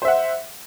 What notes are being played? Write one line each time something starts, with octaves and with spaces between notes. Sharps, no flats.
C5 E5 F#5